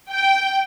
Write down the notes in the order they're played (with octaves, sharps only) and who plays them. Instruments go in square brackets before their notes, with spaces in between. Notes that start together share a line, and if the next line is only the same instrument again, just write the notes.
[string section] G5